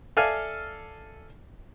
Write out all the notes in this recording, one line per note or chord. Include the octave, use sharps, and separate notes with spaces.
A4 D5 E5 F5 G#5 F6